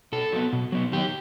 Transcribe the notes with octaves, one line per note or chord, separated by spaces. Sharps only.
B2 A4
F#3 B3
B2
F#3 B3
D#3 G4